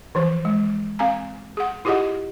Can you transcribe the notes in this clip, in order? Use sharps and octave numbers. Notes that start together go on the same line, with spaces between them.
E3 F3 C5
G#3
C4 F5 G#5 A#5
G#4 F#5
E4 F4 G4 G#4 D#5 F#5